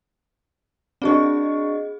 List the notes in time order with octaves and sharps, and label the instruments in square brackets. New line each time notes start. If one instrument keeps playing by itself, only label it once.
[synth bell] C4 G#4 D#5 [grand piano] D4 F#4 C#6